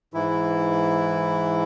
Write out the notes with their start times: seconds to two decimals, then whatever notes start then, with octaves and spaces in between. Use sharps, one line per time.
0.14 G#2 E3 E4